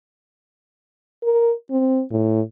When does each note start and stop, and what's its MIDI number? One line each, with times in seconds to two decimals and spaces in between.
1.23 1.53 70
1.71 2.02 60
2.11 2.41 45